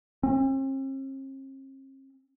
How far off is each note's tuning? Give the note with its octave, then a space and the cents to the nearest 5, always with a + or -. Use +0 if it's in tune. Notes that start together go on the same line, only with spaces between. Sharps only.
C4 +45